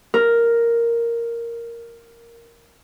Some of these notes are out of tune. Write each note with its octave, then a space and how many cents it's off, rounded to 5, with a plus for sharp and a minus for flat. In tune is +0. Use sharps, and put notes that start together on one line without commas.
A#4 +0